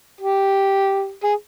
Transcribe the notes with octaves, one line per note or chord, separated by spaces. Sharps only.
G4
G#4